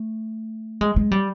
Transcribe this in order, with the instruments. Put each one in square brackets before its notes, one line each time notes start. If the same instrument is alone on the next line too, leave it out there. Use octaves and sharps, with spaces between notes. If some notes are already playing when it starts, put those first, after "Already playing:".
Already playing: [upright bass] A3
G#3
G#3
G3